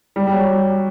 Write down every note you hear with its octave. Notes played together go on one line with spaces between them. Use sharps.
G3
G3
F#3